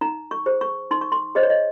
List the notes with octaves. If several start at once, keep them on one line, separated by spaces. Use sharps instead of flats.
D#4 A#5
C#6
G#4 C5
C#6
D#4 C6
C#6
C6
G#4 C5 D#5
C#5
D#5